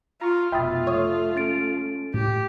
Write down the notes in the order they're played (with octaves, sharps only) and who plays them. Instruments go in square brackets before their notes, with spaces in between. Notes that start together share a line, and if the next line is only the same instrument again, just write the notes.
[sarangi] F4 [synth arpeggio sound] A#5 C#6
[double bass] F1 B2 [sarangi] F4 [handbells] E5 A6 [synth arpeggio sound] G5 B5 D#6
[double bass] A3 [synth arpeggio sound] C#5 D#6
[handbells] C#4 A6 D7
[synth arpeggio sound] A2 [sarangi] G4